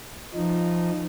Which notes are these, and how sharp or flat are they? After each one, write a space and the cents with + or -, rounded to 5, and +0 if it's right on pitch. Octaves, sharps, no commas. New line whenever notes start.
F3 -15 D#4 -15